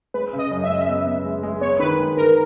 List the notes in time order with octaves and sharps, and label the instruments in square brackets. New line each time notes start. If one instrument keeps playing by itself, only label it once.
[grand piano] G#3 [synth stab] B4
[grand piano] C#3
[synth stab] D#5
[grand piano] F#2
[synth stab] E5
[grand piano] G#3 [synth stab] D#5
[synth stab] E5
[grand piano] B3
B3
G#3
G#3
[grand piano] B3 [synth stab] C#5
[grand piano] D#3 [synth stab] B4
[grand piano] G#3
[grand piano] D#3 [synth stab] A#4